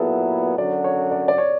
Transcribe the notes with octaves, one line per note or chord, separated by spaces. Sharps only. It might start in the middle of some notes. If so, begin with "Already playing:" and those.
Already playing: A#2 F#3 B3 E4 G#4 A4
F#2 D3 F#3 D5
C#5
D5
D5
C#5